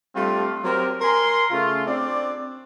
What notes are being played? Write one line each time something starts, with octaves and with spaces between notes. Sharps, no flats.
G3 A3 C4 D4 F4
F#3 C4 G4 A#4
A#4 G#5 A#5 C6
C#3 A3 F4
C4 D4 D5